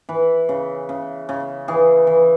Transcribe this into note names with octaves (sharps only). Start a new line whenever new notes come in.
E3 B4
C#3
C#3
C#3
E3 G#4
E3